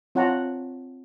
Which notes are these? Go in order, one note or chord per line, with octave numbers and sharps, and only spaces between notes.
C4 F4 C#5 F#5 A5 A#5